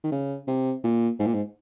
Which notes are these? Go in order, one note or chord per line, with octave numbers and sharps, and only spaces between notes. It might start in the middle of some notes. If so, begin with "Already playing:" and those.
D#3
C#3
C3
A#2
G#2
A#2
G#2